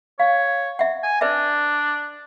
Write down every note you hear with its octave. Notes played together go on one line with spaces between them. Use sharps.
C#5 F5
E5 F#5
G#5
D4 B4 D5 E5